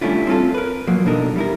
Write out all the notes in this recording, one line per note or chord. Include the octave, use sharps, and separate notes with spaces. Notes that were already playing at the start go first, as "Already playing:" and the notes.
G3 A3 C#4 D4 E4 F4
C4 C#4 F4 A4
A#4 B4
F3 F#3 A#3
B2 F3 D4 D#4 A4 A#4
G3 E4 A#4